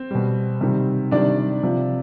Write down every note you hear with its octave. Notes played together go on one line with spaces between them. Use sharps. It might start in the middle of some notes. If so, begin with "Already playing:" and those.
Already playing: C4
B2 G3
C3 D#3 G3
C3 D#3 G3 D4 D5
C3 F3